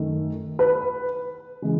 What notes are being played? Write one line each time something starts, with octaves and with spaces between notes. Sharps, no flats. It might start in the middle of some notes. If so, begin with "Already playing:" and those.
Already playing: F#2 D#3 A3
B4
C#3 E3 G#3